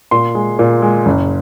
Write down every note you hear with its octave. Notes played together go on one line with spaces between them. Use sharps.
A#2 C6
G#3
A#2
G#3
F#1